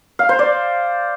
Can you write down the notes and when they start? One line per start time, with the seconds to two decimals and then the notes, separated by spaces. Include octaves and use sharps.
0.19 F5
0.29 C5
0.39 D5